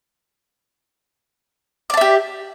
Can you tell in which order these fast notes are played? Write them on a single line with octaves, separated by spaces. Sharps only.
D5 A5 E5 G4